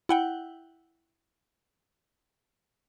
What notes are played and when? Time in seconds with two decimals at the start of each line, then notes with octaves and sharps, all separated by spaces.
0.09 E4 F#5 G5